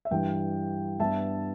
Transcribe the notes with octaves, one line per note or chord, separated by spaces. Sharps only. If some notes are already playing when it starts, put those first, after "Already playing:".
E5
G2 E3 G3 G5
G2 G3 B3 D4 E5 A5